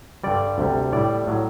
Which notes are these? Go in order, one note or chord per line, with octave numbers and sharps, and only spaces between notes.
G2 D3 G3 D5
D2 C3 G3
A2 G3 D5
A2 F#3